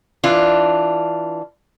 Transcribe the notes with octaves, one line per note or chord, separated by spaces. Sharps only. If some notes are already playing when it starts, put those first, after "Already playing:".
E3 D4 F4